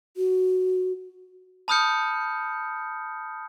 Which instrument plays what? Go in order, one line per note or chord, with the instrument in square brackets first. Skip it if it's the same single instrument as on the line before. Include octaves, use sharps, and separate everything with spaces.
[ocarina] F#4
[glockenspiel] A5 B5 D#6 F6 G6 C#7